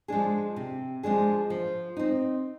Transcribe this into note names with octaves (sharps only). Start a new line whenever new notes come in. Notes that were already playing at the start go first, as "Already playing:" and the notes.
F3 G#3 D4 G#4
C3
F3 G#3 D4 G#4
F3
C4 D#4